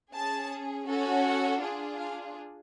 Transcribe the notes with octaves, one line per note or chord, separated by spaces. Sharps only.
C#4 G#4 A5
C#4 F#4 A4
F#5
D4 F4 G#4
F5